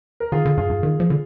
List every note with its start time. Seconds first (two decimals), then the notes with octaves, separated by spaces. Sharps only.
0.20 A#4
0.32 D#3 F4 G#4
0.45 D3
0.57 G2 F4 G#4
0.70 G2
0.83 D#3
1.00 F3
1.10 D3